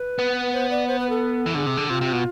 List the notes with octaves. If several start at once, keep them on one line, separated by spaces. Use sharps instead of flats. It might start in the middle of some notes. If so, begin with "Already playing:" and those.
Already playing: B4
B3
C5
D5
C5
B4
A4
E3
D3 G#4
C3
D3
C3 F4
C3
B2